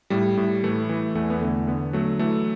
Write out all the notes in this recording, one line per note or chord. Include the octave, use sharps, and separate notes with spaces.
A2 G3
A2
E3 A3
E3
E2 A3
B3
D3 A3
D3 B3
F#3 A3
E3 A3